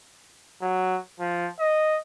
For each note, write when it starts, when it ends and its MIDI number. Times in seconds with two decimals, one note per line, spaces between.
0.62 0.99 54
1.20 1.49 53
1.59 1.98 75